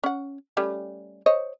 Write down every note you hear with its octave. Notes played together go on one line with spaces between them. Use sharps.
C#4 F#5
G3 A3 C#4
C5 C#5 D#5